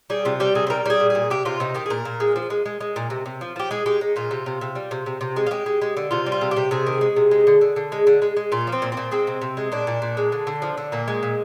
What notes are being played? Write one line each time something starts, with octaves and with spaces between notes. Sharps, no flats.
G3 G#4
C3 F4
G3 G4
C3 G#4
C5
G3 A#4
G3 G#4
A#2
G#4
A#2
C3 G4
C3 F4
C3 D#4
D#3 G4
G#4
A#2 A#4
A#2
G#3
F3
G#3
G#3
G#3
A#2
C3
C3
F3
F3 G4
G#3 G#4
G#3 G4
G#3 D#4
A#2 F4
C3
C3
C3
G3
C3
C3
C3
G#3
F4
G#3 G4
G#3
G#3
D3
C3 F4
G3
F4
C3
G4
C3
C3 G#4
D#3
G#3
C3
G#3
D3
D3
D3
G#3
D3
G#3
G#3
A#2 F4
F3
C4
A#2
C4
A#2
G#3 C4
C3
C3
G#3
A#2 D4
A#2
A#2
G#3
D3
D3
F3
D3
A#2 A#3
G#3
A#2